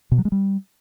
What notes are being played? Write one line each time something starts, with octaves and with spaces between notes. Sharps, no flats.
B2
F#3
G#3
G3